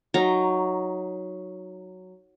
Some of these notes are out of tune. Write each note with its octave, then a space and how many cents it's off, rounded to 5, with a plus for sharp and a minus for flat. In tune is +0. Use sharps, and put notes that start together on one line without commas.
F#3 +0 D#4 +10 A#5 +0